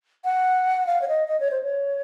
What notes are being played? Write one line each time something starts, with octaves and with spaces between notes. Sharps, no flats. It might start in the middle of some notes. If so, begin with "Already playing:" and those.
F#5
F5
C#5
D#5
D#5
C#5
C5
C#5